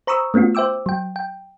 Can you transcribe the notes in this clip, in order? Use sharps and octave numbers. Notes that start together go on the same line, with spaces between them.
C5 A#5 B5 C#6 D#6 E6
A3 B3 C#4 F4 F#4
C5 E5 G5 D6 E6
F#3 G5
G5